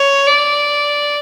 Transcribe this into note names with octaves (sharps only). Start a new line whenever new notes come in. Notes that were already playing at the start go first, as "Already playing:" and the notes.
Already playing: C#5
D5